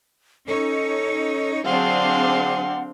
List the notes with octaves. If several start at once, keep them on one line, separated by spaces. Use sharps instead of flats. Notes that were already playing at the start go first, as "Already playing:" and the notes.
C#4 D#4 A4 C#5
D3 F#3 C4 D4 G#4 F5 F#5 C6